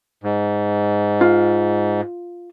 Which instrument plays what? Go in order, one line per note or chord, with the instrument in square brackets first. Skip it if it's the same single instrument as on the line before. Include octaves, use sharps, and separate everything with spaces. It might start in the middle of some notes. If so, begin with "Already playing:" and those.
[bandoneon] G#2
[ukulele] F4